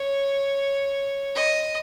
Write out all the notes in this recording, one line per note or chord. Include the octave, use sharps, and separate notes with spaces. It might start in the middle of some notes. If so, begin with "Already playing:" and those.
Already playing: C#5
D#5